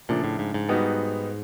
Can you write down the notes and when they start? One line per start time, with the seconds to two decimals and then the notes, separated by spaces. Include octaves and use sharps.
0.09 A#2 C#3 F3 A3 D4
0.24 A2
0.39 G#2
0.54 G#2
0.69 G3 B3 D#4 F#4